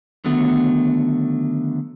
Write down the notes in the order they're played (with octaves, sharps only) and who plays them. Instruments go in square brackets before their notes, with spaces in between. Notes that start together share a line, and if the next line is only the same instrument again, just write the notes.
[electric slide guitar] D3 D#3 F#3 A3 B3